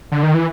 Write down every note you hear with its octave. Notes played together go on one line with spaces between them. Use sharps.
D3
D#3
E3